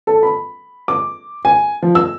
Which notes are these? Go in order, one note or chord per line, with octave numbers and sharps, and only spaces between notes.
A4
B5
D6
G#5
F3
E6